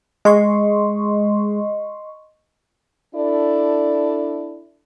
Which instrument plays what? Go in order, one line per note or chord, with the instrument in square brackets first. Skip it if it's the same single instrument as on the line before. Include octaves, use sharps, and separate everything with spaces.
[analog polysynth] G#3 [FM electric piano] D#5 C6 C#6
[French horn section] D4 E4 A4 D5